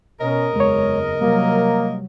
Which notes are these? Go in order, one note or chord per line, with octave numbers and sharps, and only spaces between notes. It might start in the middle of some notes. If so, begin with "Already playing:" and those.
B2 C#4 A#4 D#5
F#1 E2 G#3 C#5
C3 F#3 G3 A#3